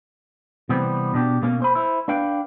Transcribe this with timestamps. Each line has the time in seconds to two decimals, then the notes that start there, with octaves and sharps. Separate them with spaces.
0.69 C3 E3 G3 B3 C4
1.14 B2 D4 G4
1.42 B2 A#3 C#4
1.62 C5 B5
1.75 E4 C5
2.08 D4 B4 F5 G5